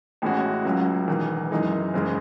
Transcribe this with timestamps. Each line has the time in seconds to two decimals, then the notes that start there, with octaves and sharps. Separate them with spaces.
0.22 A1 A2 G#3 C#4 F#4
0.65 C#2 C#3 F#3
1.08 E1 E2 D#3
1.51 F#2 E3 G#3 D#4 G#4
1.93 F#1 E2 C#3 G#3